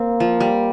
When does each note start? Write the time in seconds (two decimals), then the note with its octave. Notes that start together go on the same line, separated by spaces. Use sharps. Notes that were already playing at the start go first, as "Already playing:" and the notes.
Already playing: A#3 C4
0.20 F3
0.40 G3